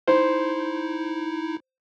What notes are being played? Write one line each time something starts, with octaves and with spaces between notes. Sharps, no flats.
D#4 E4 C5